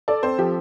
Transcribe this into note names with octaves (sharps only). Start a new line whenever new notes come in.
A4 D5
C4 C5
F3 G4